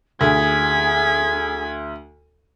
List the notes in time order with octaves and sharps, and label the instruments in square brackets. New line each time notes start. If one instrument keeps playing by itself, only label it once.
[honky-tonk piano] D2 [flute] G#4 [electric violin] G#6 B6